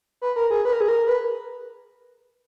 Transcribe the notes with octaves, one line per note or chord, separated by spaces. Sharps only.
B4
A#4
G#4
B4
A#4
G#4
A#4
B4